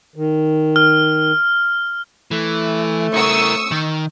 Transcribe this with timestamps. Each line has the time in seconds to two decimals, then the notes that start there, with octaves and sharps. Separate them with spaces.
0.16 D#3
0.76 F6
2.31 E3 A3
3.14 E4 A#4 C#6 D#6 E6
3.71 D#3